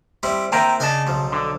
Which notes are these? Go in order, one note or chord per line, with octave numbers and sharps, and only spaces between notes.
G3 C4 E4
A#3 C4 E4 G5 A#5
C#3 D4 D#5 G#5 A5
B1 F3
D3